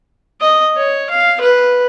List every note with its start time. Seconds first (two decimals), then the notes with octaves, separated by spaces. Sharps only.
0.41 D#5
0.77 C#5
1.10 F5
1.40 B4